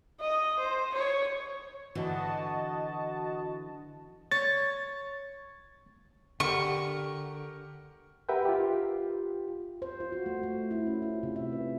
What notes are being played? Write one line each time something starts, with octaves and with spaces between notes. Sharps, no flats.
D#5
C5
C#5
D3 E3 F#4 D#5 A5
C#5 A6
D3 G4 A#4 F#5 C#6
G4 A#4 B4 E5 F#5 G5
F4 G4
C5
F4
F#4
A3
A3
E4
C#4
F4
C3
E5
B4